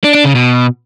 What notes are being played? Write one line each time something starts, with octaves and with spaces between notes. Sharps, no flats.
D4
D4
C#3
B2